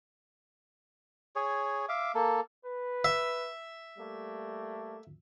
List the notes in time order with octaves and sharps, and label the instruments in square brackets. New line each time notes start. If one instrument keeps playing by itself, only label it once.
[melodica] G#4 C#5
E5 F5 D6
A#3 A4
[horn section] B4
[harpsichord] E5
[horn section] G3 A3 A#3